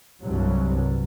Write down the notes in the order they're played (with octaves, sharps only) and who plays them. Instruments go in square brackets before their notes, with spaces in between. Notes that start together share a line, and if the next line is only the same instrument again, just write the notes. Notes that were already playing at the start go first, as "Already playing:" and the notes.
[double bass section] C2 G2 F#3